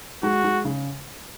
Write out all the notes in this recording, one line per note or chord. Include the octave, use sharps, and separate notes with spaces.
G#3 F#4
G#3
C#3